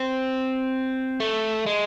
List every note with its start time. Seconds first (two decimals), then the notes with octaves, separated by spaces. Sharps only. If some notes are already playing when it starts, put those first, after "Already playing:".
Already playing: C4
1.20 A3
1.66 G#3